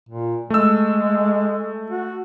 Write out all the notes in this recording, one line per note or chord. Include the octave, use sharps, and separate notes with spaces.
A#2
G#3 A3 E6
F#4